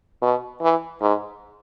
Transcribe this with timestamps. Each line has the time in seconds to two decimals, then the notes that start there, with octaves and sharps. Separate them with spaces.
0.22 B2
0.62 E3
1.01 G#2